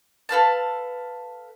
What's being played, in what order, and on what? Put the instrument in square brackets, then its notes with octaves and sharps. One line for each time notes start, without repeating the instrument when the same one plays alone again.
[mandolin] A4 B4 F5 A5